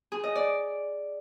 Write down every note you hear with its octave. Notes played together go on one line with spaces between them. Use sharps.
G#4
D#5
D5